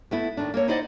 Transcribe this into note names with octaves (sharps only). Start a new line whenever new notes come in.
A3 B3 E4
A2 D#3 A3 D4
A#3 A#4 C#5
D#4 E4 C5 D5 D#5 F#5